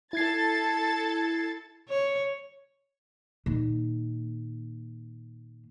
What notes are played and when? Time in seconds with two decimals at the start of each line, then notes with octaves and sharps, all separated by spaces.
0.13 E4 A4 G#6 A6 C7
1.89 C#5
3.46 A#2 D#3